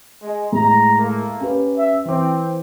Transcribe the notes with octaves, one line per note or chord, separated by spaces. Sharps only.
G#3
A2 G#3 A#5
A3 A#3
C#4 G4 B4
E5
E3 C4 D6